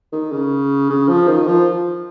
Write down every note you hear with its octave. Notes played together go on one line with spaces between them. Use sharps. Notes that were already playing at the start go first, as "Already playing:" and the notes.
D#3
C#3
C#3
F3
D#3
F3